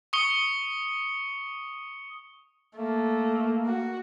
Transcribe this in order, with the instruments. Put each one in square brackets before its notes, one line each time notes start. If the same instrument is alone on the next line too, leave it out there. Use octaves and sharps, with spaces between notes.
[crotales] C#6 D#6 C#7 G7
[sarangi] A3 [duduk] A#3
[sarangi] F#4